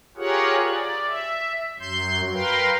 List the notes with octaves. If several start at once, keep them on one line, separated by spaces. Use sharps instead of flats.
F4 G4 G#4 A#4 C#5 F#5
D5
E5
F#2 F#3 C6 G6
A#4 B4 F5 G5 C6